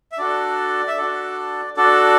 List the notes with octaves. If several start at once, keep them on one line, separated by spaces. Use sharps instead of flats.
E5
D4 F#4 A4 D5
E5
D4 F#4 A4 D5
D4 F#4 A4 D5